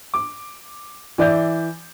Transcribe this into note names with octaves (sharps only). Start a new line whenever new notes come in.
D6
E3 D5 E5 G6